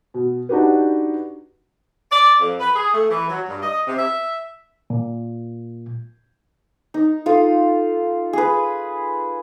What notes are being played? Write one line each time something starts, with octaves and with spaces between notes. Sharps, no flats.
B2
D4 D#4 F#4 G4 B4
D5
F2
B4
G#4
A3
E3
F#3
G2
D#5
C3
E5
A#2
D#4
F4 A4 D#6
G#4 B4